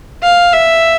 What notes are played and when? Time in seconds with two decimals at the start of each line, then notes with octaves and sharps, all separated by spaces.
0.23 F5
0.53 E5